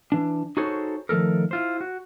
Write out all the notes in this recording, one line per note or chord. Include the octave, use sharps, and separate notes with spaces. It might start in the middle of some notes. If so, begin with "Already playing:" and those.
E3 D4
D#4 F#4 G#4 A4 C5 C#5
D#3 F3 A3 A4 A#4
E4 F4 C5
F#4